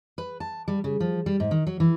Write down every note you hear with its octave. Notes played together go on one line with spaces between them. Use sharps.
B4
A5
G3
C#3
F3
G3
G#2
D#3
F#3
E3